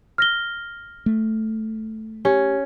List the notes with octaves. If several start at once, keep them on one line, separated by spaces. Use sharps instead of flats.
F6 A#6 G7
A3
C#4 G4